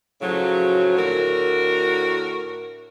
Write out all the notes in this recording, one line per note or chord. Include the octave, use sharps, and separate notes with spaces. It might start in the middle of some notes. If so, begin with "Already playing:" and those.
A2 C#3 F3 F#3
A2 D3 F#4 A#4